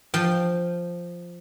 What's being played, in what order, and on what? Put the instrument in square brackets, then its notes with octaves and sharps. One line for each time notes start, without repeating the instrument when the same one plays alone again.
[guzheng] F3 G5